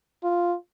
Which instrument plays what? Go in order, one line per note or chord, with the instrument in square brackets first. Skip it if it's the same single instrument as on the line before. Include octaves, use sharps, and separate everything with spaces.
[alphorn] F4